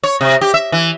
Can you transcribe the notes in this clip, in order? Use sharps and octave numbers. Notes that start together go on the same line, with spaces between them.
C#5
C3
G4
E5
E3